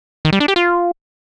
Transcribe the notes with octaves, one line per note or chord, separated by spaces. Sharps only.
D#3
G3
D4
G4
F4